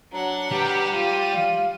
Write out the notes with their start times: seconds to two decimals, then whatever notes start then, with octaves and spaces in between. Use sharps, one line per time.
0.13 F#3 D4 F#5 A#5
0.52 G3 B4
0.94 F4 G4 D#7
1.35 F5